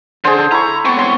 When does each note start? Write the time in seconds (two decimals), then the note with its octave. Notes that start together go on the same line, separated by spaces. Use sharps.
0.24 D3 G#4 C5
0.38 A4
0.52 E4 A#5 C#6
0.85 B3 C4 C#6
0.97 C#5 C6 C#6